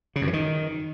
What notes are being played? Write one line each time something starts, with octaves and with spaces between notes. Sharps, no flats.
C#3
F#2
E3
D#3